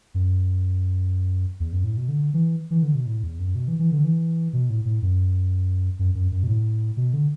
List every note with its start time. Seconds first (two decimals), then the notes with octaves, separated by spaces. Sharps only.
0.14 F#2
1.60 E2
1.73 F#2
1.84 A2
1.97 B2
2.08 D3
2.34 E3
2.71 E3
2.83 D3
2.95 B2
3.06 A2
3.23 E2
3.39 F#2
3.55 B2
3.68 E3
3.79 E3
3.92 D3
4.04 E3
4.53 B2
4.70 A2
4.85 A2
5.02 F#2
5.99 F#2
6.15 F#2
6.32 F#2
6.43 B2
6.47 A2
6.97 B2
7.14 D3